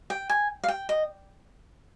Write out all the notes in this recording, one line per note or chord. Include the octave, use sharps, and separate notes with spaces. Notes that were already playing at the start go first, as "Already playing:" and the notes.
G5
G#5
F5
G5
D#5